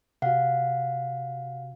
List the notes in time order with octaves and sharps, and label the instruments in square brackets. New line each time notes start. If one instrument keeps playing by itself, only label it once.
[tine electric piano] C3 F#4 [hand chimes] F5 F#5